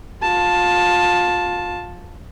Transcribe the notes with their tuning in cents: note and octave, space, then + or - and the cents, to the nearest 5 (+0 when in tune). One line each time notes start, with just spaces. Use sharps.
F4 +25 A5 +0